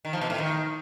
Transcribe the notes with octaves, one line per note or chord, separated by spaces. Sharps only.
D#3
F3
B2
A2
D#3